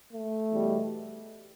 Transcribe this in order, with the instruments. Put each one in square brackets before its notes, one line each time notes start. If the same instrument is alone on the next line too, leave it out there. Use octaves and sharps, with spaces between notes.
[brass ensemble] A3
E2 B2 G3